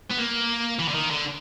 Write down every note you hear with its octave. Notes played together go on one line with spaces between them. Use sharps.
B3
A#3
E3
D3
D#3
D3